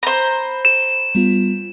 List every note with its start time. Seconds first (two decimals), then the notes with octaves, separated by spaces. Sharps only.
0.03 C5 A#5 B5
0.65 E7
1.15 G3 B3 F4